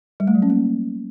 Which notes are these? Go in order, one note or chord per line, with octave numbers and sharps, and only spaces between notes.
G3
A3
F#3
C#4
A#3